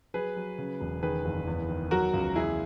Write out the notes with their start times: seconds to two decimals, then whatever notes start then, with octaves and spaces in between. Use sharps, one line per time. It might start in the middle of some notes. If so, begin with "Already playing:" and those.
0.14 F#3 G#4 B4
0.36 F#3
0.58 C#3
0.81 E1
1.03 D#3 G#4 B4
1.25 F#1
1.47 E2
1.69 D#3
1.91 F#3 F#4 A#4
2.13 C#2
2.36 E2 E4 G#4